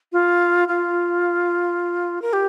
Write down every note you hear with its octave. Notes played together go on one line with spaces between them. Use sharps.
F4
F4
A#4
G4